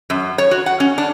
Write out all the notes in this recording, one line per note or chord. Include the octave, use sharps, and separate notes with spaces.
F#2
C#5
F#4
F#5
C#4
D4